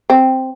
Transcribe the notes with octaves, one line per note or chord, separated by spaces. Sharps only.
C4